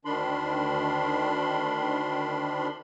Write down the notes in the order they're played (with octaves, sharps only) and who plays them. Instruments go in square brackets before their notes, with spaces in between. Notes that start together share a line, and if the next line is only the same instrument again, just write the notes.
[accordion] D2 D#3 D4 B5 C6